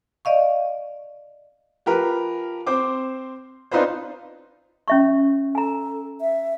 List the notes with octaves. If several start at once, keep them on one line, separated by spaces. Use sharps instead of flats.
D5 D#5 F5 C#6
F3 G4 A#4 B4
C4 C5 D6
C4 D4 D#4 F4 B4 C5
C#4 E5 C#6
A4 G#5 A#5
E5